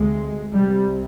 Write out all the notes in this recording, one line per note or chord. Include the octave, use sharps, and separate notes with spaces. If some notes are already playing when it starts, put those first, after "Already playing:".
Already playing: D2 C3 G#3
C2 C3 G3